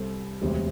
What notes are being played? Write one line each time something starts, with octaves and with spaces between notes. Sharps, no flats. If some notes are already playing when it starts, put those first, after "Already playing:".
Already playing: C2 C3 G3 A4 C5
E1 D2 C3 G3